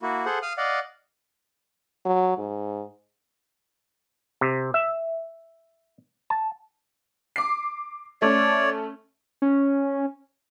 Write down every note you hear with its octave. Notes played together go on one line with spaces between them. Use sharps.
A#3 E4 F#4
G#4 A4 C5 F#5
F5 D#6 F6
D5 D#5 F5 F#5
F#3
G#2
C3
E5
A5
D6 C7
A3 C#4 C#5 D5
C#4